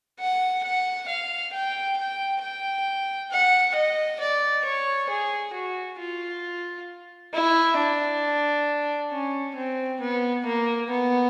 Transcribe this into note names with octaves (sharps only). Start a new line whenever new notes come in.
F#5
F#5
F5
G5
G5
G5
F#5
D#5
D5
C#5
G#4
F#4
F4
E4
D4
C#4
C4
B3
A#3
B3